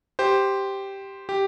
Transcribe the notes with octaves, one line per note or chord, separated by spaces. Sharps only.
G4 C5
G4